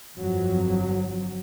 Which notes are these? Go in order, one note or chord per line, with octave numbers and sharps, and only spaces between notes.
G1 F2 F3 F#3